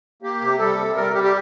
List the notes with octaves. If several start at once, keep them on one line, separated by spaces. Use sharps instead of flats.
A#3 G4
C3
G3 A4
C3
G3 A#4
G3 G4
G4